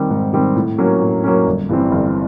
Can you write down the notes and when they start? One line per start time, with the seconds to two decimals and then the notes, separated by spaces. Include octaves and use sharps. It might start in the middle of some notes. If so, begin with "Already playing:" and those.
Already playing: D#3 G3 C4
0.10 G#2
0.33 D#3 G3 C4
0.56 A2
0.78 F#3 A#3 C#4
1.01 A2
1.24 F#3 A#3 C#4
1.47 G1
1.69 G2 E3 G3 C4
1.92 G1